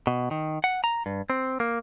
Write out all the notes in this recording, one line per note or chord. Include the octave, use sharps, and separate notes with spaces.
B2
D#3
F#5
A#5
G2
C4
A#3